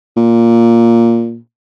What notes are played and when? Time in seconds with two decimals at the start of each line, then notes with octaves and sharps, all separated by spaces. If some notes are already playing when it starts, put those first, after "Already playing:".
0.17 A#2